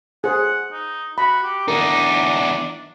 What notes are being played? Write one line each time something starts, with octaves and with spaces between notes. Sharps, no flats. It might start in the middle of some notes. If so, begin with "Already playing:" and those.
G#4 C5 F#5
D#4
F#4 B5
G4
E2 D4 D#4 A#4